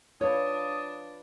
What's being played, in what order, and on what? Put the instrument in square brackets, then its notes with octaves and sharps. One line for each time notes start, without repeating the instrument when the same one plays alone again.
[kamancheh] D4 [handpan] F4 B4 [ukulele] C#5 [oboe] D#6